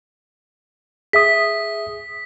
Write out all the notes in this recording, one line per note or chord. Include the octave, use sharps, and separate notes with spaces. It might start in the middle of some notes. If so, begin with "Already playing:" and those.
G#4 E5 D#6 B6